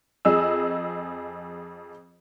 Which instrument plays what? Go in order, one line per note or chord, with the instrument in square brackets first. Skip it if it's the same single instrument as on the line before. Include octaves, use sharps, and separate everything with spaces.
[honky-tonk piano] F2 G#4 D#5 E6